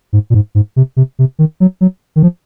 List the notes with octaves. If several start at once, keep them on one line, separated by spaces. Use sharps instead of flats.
G#2
A#2
G#2
G#2
C3
C3
C3
D#3
F#3
F#3
D#3
F3